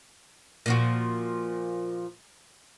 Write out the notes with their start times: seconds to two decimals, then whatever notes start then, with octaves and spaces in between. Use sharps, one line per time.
0.66 A#2 F3 F#4